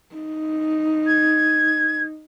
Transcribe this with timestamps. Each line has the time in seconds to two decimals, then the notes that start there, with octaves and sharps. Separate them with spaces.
0.15 D#4
1.06 G#6